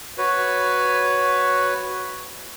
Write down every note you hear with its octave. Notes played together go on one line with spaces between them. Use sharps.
F#4 B4 C#5